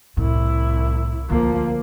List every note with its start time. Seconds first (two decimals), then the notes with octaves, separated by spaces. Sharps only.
0.17 C2 A2 E4
1.30 D2 F3 A#3